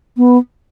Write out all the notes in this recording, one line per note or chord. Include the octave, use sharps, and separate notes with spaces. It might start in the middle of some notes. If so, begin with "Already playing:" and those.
B3